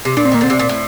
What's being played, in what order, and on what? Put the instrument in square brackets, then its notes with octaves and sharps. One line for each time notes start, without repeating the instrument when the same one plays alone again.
[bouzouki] C3
[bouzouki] A#2 [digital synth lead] D4
[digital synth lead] C4
[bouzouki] D#3 [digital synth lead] A#3
[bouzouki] D3 [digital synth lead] C4
[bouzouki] C3
A#2
A2